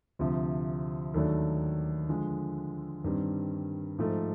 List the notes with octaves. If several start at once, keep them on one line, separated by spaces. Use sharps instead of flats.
D2 C3 F3
D#2 D#3 F#3 A3 D4
D3 F3 G#3
G2 D#3 G3 C4
G#2 F3 A3